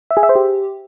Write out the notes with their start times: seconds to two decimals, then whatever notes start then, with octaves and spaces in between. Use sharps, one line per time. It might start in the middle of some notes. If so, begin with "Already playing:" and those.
0.11 E5
0.17 G#4
0.23 E5
0.29 C5
0.35 G4